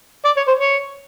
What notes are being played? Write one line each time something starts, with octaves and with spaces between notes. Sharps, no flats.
D5
C#5
C5
C#5